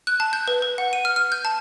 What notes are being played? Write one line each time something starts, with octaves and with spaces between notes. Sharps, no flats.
F#6
A5
G6
B4
B4
F#5
D#7
F6
F6
G6
A5